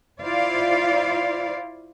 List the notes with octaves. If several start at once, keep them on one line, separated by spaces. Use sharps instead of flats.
E4 F4 C5 D5 F5